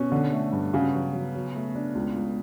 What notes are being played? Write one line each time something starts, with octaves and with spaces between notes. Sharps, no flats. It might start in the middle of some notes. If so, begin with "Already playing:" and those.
Already playing: B2 C#4
D3
A3
G2
C#3 F#4
F#3
F#3
F#3
A3
D4
C#2
C#2